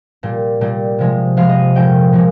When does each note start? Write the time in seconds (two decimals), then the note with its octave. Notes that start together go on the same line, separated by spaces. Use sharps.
0.23 A#2 G3
0.61 A#2 G3
0.99 C3 F3 G#3
1.37 C3 F3 G#3 F5
1.49 D#5
1.75 A#2 F3 G#3 G5
2.12 A#2 F3 G#3